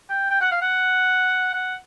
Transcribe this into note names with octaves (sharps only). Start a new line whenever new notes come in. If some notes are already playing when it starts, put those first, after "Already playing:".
G5
G5
F#5
F5
F#5
F#5